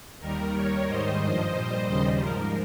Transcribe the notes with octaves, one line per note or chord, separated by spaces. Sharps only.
D#2 D#3 G3 A#4
D#2 D#3 G3 A#4 C#5
G#2 D#3 G3 C5 D#5
G2 F3
A#2 G3
D#2 C#3 G3
G#2 F3 A#4